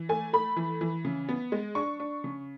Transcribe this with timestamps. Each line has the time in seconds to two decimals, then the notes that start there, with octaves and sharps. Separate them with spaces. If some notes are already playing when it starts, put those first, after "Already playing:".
Already playing: E3
0.09 A3 G#5
0.33 A3 B5
0.56 E3
0.81 E3
1.05 C#3
1.29 B3
1.52 G#3
1.75 D4 C#6
2.00 D4
2.24 C#3